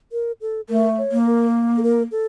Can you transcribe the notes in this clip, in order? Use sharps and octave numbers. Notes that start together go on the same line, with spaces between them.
A#4
A4
A3 A#4
C#5
A#3
A#4
A4
A#4
A4